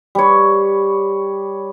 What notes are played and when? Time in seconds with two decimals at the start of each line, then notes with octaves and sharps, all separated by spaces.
0.15 G3 C#5